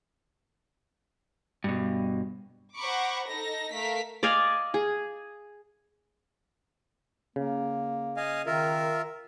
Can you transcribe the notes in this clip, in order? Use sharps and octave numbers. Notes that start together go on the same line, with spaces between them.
G2 B2
C5 F#5 A#5 B5 C#6 D6
D#4 A4 A#6
A3 A#4 F5 B6
D5 D#5 F5 G#5
G#4
C#3 A#3
D#5 F5 G#5
D#3 F4 A#4 E5